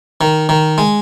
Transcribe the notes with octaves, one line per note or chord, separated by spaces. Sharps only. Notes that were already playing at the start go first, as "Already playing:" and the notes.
D#3
D#3
G#3